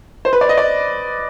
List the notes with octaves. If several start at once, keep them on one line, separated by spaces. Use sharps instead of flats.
C5
B4
D5
D#5
D5